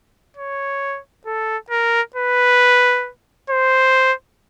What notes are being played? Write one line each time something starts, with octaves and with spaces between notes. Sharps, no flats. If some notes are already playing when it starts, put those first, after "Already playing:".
C#5
A4
A#4
B4
C5